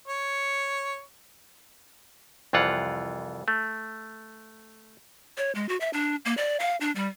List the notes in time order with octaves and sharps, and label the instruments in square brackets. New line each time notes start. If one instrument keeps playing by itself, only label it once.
[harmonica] C#5
[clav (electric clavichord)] C2 F2 E3 F4 F#5
A3
[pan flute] C#5
G#3
F#4
E5
D4
A#3
D5
F5
D4
G3